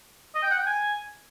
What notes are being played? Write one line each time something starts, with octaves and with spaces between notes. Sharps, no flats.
D#5
G5
F#5
G5
G#5